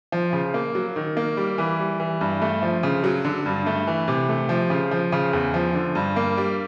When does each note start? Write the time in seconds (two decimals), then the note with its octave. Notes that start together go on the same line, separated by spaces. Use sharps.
0.12 F3
0.33 C#3
0.54 A#3
0.75 F#3
0.96 D#3
1.17 A#3
1.37 G3
1.58 E3
1.79 G3
2.00 E3
2.21 G2
2.42 A3
2.62 F3
2.83 C#3
3.04 F#3
3.25 D3
3.46 G2
3.66 A3
3.87 E3
4.08 C3
4.29 A3
4.49 F3
4.70 C#3
4.91 F3
5.12 C#3
5.33 E2
5.54 F3
5.74 D3
5.95 G2
6.16 A#3
6.37 G3